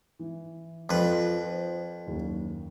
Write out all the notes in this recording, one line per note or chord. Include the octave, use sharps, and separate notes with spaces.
E3
F2 F3 B4 C6
C5
F#1 D#2